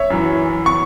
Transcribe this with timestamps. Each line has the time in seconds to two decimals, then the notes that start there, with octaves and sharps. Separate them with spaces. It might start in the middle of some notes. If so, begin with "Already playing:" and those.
Already playing: C#5 E5
0.10 F#2 E3
0.66 C#6